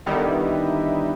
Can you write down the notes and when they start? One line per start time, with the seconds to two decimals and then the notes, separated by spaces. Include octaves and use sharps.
0.06 D3 D#3 G3 B3 D#4 E4